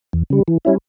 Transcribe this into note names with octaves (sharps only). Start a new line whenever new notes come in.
E2
C#3 G3
E3
G3 C#4 E4